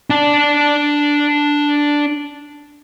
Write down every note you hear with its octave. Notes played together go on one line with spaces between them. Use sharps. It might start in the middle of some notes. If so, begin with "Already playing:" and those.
D4 A5